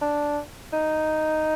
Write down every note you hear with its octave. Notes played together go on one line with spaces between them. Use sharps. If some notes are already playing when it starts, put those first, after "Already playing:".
D4
D#4